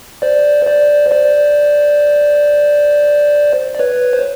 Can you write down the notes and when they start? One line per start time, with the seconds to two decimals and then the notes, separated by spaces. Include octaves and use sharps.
0.22 C5 D5
0.66 C5 D5
1.11 C5 D5
3.75 D5
3.79 B4 C#5
4.13 C5